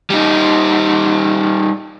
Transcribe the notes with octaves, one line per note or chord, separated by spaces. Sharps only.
G3 D#4